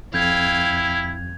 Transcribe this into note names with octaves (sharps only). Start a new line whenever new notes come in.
F2 E4 F5 G5 G6 G#6 F7